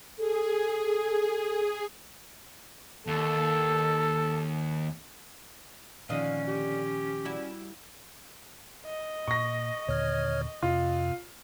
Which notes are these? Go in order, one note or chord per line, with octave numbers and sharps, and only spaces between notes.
G#4 A4
D#2 A4
A#2 D3 D#3 F3 C#4 D#5 F5
G4
G3 E4 F#4
D#5
A#2 C#6 A#6
D#2 A#2 D3 C#5 F6 G#6
F2 C3 F4